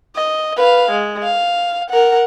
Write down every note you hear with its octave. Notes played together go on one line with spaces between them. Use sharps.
D#5
B4 F5
G#3
F5
A#4 F#5